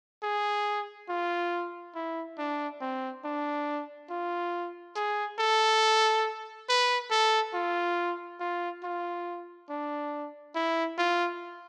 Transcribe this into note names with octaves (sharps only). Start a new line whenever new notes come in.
G#4
F4
E4
D4
C4
D4
F4
G#4
A4
B4
A4
F4
F4
F4
D4
E4
F4